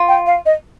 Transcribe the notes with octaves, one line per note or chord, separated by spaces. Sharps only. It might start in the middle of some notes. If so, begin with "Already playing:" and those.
Already playing: F4
G5
F5
D#5